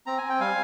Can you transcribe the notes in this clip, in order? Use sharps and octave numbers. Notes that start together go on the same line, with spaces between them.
C4 A#5
C4 G#5
G5
G3 F5 G#5